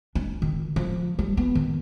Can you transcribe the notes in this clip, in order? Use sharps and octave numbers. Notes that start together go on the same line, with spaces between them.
D4
D#3
F3
G3
B3
D#3